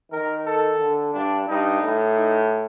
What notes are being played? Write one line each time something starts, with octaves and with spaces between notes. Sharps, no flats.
D#3 A#4
A4
D3
G2 D4
G2 D#4
A2
D#4